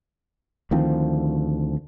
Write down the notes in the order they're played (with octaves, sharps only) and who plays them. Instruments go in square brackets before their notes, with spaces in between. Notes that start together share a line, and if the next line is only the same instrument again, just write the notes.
[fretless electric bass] D2 D#3 F3 C4